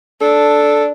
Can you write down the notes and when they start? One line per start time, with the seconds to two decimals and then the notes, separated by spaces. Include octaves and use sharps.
0.21 D4 A4